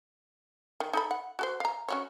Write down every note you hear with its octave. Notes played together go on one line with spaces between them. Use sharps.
D#3
D#4 A4 B5
F#5
F#4 A4 C5
F5 A#5
C#4 F#4 C#5